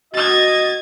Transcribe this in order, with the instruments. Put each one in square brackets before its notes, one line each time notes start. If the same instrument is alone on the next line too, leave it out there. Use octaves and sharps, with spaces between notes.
[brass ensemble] F#4 D#5 [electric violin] G#6 A6